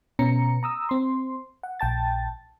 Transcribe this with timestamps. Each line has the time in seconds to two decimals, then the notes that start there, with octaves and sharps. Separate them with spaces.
0.19 B2 B3 C#4 A#5 C#7
0.63 A#5 D#6 E6
0.89 C4 C6
1.63 F#5
1.80 A#1 G5 A5 A6